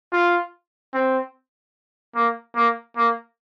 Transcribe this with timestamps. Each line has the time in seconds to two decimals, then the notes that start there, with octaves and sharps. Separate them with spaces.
0.13 F4
0.94 C4
2.15 A#3
2.56 A#3
2.97 A#3